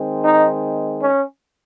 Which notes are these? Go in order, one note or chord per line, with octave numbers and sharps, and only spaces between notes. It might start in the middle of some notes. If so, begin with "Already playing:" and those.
Already playing: D#3 G#3 C4
D#4
C#4